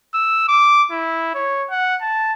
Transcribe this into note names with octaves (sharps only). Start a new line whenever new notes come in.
E6
D6
E4
C#5
F#5
A5